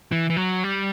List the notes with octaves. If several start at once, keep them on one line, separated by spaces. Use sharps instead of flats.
E3
E3
F#3
G3